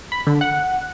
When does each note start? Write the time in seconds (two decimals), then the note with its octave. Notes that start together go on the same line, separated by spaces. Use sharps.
0.12 B5
0.27 D3
0.41 F#5